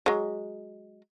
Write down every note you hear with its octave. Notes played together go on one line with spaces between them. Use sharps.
F#3 G#3